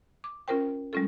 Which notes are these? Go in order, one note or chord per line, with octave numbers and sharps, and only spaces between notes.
D6
C#4 F4 A#4 C5 G5
G3 G#3 C#4 F4 A4